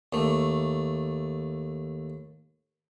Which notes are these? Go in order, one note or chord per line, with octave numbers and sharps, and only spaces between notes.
D#2 A3